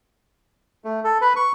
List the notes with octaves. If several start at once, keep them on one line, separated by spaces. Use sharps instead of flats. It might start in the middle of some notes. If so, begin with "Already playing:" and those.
A3
A4
B4
C#6